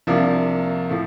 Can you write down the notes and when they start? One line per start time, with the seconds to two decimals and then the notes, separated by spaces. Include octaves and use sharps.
0.07 C2 C3 F3 A#3 D4
0.90 A2 F3